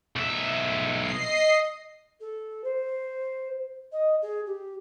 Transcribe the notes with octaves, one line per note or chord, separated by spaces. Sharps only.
B1 E5
D#5 C7
A4
C5
D#5
G#4
G4